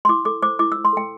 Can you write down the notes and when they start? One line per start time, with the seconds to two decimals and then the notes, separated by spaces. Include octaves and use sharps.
0.05 C6
0.09 E4 D6
0.25 A4 D6
0.43 C5 D6
0.59 E4 D6
0.72 E4 E6
0.85 C6
0.93 A4 G5